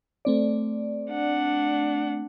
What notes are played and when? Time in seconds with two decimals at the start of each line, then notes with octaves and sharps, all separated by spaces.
0.25 A3 C4 D5
1.11 D4 F#5